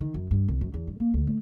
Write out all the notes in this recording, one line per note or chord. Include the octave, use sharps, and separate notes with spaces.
D#3
F#2
G2
C2
F#2
E2
G2
A#3
D2
A3